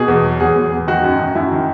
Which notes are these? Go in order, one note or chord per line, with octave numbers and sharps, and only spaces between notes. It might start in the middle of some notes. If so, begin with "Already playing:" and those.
Already playing: B2 G#4
E2
F#3
E2 G#4
E2
E2
D#3 F#4
F#2
F#2
F#2 E4
D#3